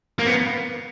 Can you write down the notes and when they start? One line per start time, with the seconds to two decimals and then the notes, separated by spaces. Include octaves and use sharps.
0.19 A#3
0.27 B3